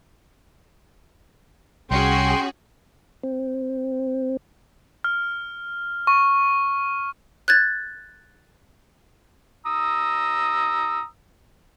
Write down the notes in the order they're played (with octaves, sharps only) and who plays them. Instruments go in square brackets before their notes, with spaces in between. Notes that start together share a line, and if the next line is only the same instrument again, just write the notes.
[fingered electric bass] C2 [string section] C#4 F#4 G#4 [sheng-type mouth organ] G5 C6
[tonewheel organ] C4
[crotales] F6
C#6
[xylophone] F#6 G#6 A6
[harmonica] A#5 D#6 E6